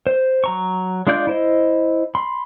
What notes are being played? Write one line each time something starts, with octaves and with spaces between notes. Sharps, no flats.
C5
F#3 A#5 C#6
G#3 D4 F4 D5 G6
E4 C5 D#5
B5 C6